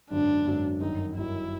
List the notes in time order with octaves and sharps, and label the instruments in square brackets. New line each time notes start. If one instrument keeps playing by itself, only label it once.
[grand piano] G#1 F#2 D3 F#3 [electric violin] D4
[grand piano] G#1 F#2 D3 F#3
[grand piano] G1 F#2 D#3 F#3 [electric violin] D#4
[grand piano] G1 F#2 D#3 F#3 [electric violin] E4